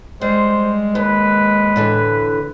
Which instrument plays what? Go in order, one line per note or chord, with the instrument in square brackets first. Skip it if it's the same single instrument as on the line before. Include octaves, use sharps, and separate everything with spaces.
[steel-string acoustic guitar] G3 [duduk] G#3 [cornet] C5
[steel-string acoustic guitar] D#2 [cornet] B4
[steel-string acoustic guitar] A2 D3 E3